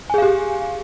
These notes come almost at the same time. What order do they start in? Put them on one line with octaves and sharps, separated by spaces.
G#5 G#4 F5 G4